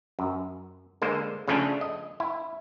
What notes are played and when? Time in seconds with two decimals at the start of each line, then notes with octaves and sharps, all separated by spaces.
0.19 F#2
1.02 D3 G#3 A#3 C5
1.48 C#3 F3 A3 C#4 D4
1.81 D#5
2.20 E4